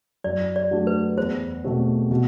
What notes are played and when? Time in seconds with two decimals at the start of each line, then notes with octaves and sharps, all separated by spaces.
0.24 F#2 D5
0.56 D5
0.71 F#3 A3 D4 G4
0.87 B4
1.17 E2 C5
1.64 B2 A3 C4 G4
2.11 B2